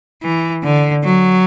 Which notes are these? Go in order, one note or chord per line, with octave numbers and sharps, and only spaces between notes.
E3
D3
F#3